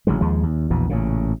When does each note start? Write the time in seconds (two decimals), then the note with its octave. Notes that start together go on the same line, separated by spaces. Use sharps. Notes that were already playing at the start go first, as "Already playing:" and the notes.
0.07 A1 D3 F#3 G#3
0.21 D#2 F3 G#3
0.43 D#2
0.70 A#1 E2 B2
0.90 A1 A#2 C#3